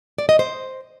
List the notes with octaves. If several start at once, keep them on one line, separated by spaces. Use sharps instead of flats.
D5
D#5
C5